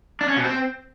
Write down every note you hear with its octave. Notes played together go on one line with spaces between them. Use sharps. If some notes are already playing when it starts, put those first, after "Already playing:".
D4
C#4
B2
C4